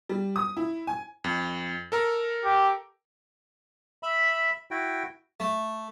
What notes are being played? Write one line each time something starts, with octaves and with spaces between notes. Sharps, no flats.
G3
D#6
E4
G#5
F2
A4 A#4 A#5
G4
E5 B5
E4 F#4 G5
A3